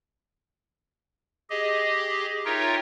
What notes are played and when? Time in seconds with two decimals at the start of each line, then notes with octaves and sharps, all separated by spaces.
1.50 G4 G#4 D#5
2.45 D#4 F4 A#4 C#5 E5 G5